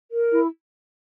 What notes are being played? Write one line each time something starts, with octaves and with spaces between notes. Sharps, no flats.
A#4
E4